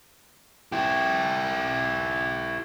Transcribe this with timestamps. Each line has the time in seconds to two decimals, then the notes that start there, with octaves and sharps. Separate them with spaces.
0.72 E4 G4